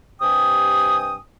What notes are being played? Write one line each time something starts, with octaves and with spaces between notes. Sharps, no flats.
G2 C3 G5 G#5 D#6